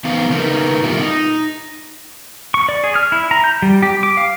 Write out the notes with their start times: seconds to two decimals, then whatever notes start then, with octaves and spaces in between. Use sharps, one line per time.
0.05 E3 B3 C4 D#4 F5
0.30 C#3 A#3 D#4 A#4 B4
0.83 B2 D#3 G3 A#3 E4 F4
1.00 D#4
2.54 C#6
2.69 D5
2.84 G#4
2.95 F6
3.12 E4
3.31 A#5
3.44 G6
3.62 G3
3.82 G4
4.03 D6
4.17 F5